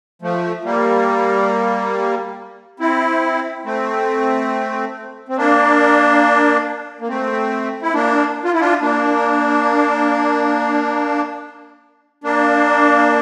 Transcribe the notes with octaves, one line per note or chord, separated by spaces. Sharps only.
F3 A3
G3 A#3
C4 E4
A3 C4
C4
A#3 D4
A#3
A3 C4
E4
A#3 D4
F4
E4
D4 F4
A#3 D4
A#3 D4